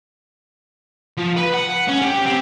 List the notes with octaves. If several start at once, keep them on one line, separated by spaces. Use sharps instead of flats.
F3
B4
F#5
C#4
G4
C4